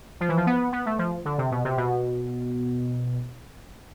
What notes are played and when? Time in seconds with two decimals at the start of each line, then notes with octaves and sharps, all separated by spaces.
0.21 F3
0.29 E3
0.37 F3
0.46 B3
0.73 B3
0.86 A3
0.98 F3
1.25 D3
1.38 C3
1.51 B2
1.64 C3
1.77 B2